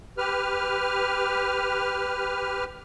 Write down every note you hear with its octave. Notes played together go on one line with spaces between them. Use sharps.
G4 B4 F6